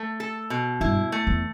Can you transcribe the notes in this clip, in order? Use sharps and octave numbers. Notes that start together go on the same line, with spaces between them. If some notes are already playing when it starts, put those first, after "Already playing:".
Already playing: A3
A4
B2
G2 E4
A3
E2